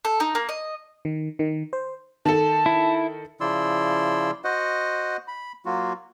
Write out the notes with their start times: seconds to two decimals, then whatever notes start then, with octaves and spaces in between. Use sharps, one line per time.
0.05 A4
0.20 D#4
0.35 A#3
0.49 D#5
1.05 D#3
1.39 D#3
1.73 C5
2.25 D#3 A4 A5
2.66 E4
3.41 C#3 F3 E4 D5 C6 E6
4.44 F#4 C5 D#5 F#5
5.28 B5
5.66 F#3 A#3 F4 F#4